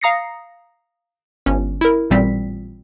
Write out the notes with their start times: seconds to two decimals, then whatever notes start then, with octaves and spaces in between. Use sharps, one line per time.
0.01 F5 A#5 D#6 A#6 C7 C#7
1.46 G1 C#4
1.81 E4 A#4
2.10 A1 A#2 G3 C4 B6